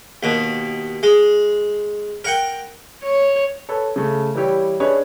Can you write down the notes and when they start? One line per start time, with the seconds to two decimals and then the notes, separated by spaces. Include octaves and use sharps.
0.23 D#2 B2
1.03 G#3
2.24 A#4 F#5 G5
3.03 C#5
3.69 A4 B4 C#5
3.96 C#3 A3
4.35 E3 G3 E4 G4 C#5
4.80 C#4 D4 G#4 B4 C#5 D#5